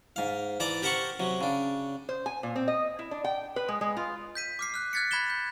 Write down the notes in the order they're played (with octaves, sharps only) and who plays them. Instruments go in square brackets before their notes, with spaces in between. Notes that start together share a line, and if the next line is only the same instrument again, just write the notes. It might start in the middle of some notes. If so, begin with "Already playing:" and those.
[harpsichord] G#2 F5
E3 D5 A5 A#5 D6
G4 A#4 C5 F#5 A5 C#6
C3 F#3
C#3 D4
[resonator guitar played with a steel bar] C5
G#5
A#2
C4
D#5
E4
D4
G5
B4
G#3
G#3
F4
[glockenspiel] G6 B6 D#7
D6 F6 C7
F6 F#6
F6 F#6 G#6 A6 B6 C#7
B5 G#6 B6 E7 G7
G6